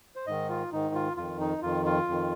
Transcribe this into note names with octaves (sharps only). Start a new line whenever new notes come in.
C5
G#2 D#3 D#5
F4
G#2 D#3 D#4
F4
F2 D#3 F4
D#4
F2 D#3 F4
F4
F2 D#3